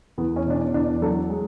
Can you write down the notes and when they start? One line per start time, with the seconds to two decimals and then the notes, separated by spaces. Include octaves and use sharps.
0.18 E2 B3
0.36 C#4
0.46 B2 D4
0.55 C#4
0.74 E2 D4
0.88 D4
1.02 F#3 A4
1.30 G#3